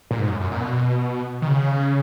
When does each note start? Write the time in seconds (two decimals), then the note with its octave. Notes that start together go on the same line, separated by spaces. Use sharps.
0.11 A#2
0.19 G#2
0.29 F#2
0.40 F#2
0.51 A#2
0.61 B2
1.42 D#3
1.48 C#3